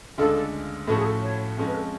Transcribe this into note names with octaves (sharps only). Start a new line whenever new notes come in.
D2 C#3 G#3 D4 F4 A4
A2 F3 A3 C#4 F#4 A4
G#4
A4
C#5
F2 F3 G#3 C#4 A4
B4
A4